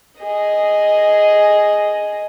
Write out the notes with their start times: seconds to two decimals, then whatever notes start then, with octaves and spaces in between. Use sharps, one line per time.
0.20 G#4 D#5